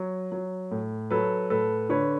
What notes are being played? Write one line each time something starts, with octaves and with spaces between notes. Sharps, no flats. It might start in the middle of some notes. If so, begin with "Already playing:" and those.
Already playing: F#3
F#3
A2
F#3 A4 B4
A2 A4 B4
D3 B4 C#5